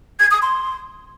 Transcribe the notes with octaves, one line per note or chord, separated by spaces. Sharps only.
G#6
D#6
C6